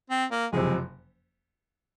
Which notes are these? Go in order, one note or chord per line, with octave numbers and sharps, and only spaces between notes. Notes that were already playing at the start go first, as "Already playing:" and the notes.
C4
A#3
F#1 F2 C3 G#3